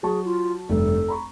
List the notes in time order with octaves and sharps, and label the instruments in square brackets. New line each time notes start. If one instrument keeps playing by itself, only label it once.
[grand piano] F#3 A5 C#6 [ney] G#4
[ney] F4
[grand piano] F1 G2 [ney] A4
[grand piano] A#5 B5 C#6